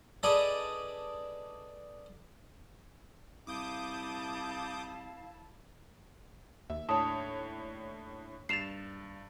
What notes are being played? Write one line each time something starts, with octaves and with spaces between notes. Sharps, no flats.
D4 G#4 A4 B4 D5 D#5
C2 E4 F5 A5 D6 D#6 G6
D#2 E5
A2 D4 C#5 A5 D#6
G2 A6 C7 E7 F7